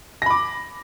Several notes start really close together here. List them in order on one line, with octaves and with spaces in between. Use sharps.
A#6 B5 D6